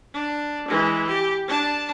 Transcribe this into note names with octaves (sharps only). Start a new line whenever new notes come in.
D4
E3 G#3
G4
D4 A5